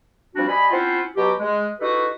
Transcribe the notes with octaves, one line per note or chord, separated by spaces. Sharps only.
F3 G3 C4 D4 F#4
G3 D#5 G#5 B5
C4 C#4 E4 F4 C5 F#5
B2 F#3 F#4 G4
G#3
D#4 E4 F#4 G4 A4 B4